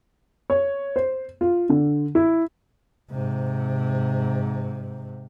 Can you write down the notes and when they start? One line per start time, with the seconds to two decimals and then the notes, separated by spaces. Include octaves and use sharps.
0.50 C#5
0.96 C5
1.41 F4
1.69 D3
2.15 E4
3.11 G#2 C3